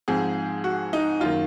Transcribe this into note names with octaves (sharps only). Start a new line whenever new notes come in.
G#2 F3 C4 G#4
F#4
D#4
F#2 D#3 A#3 F4